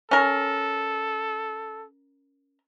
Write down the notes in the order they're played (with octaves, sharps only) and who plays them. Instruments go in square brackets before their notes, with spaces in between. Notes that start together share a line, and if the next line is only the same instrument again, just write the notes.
[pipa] C#4 A#4 [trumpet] A4